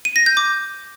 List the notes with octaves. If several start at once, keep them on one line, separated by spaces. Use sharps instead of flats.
D#7
A#6
G6
D6